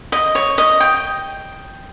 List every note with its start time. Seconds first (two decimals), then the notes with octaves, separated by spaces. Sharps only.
0.12 D#5
0.35 C#5
0.58 D#5
0.80 G5